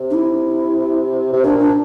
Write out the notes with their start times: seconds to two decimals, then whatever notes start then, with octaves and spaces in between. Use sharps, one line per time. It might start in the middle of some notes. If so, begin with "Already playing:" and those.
Already playing: C3
0.11 D4
0.14 E4
1.33 C3
1.43 A#2 D4
1.60 D4